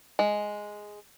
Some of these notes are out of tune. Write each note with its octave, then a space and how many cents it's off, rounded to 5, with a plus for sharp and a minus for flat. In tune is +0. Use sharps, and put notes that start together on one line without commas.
G#3 +0